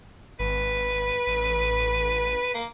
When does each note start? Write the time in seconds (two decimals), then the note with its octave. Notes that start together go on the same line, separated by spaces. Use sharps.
0.40 G#1 B4
1.27 A1
2.54 A#3